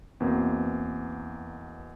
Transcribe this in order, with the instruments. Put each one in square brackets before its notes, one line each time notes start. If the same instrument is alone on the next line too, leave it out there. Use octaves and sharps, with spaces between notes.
[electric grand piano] E2 B2 A#3 C4